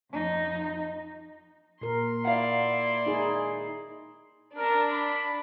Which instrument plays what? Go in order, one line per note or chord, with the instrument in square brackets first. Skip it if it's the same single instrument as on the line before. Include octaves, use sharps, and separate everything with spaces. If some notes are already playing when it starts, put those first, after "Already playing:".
[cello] F2 D#4
[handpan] A#2 A#4 [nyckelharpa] C6
[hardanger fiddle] E4 D5 [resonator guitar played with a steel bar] F5 F#5
[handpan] D#4 G#4
[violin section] D4 [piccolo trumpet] A#4
[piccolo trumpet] B5